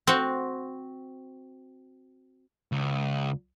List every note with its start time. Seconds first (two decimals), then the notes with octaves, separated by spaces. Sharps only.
0.07 C4 F#4
2.72 C#2